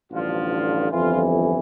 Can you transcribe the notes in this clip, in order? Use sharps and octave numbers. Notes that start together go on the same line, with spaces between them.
A1 G2 D3 F3 F4
G1 F2 E3 F4